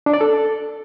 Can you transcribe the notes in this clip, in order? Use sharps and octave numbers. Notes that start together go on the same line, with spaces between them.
D4
D5
A4